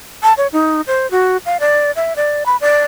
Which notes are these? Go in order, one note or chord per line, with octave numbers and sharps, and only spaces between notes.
A5
C#5
D#4
C5
F#4
F5
D5
E5
D5
B5
D5